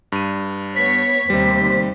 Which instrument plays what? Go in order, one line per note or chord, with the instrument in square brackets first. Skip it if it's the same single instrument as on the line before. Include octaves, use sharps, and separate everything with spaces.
[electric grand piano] G2 D#7
[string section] B3 C#5 [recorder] B6
[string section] D#2 C5 [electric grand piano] C3 G3